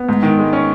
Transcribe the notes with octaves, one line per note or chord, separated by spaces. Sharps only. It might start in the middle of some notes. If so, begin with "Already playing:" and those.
Already playing: B3
G#2
D#3
G#3
C#4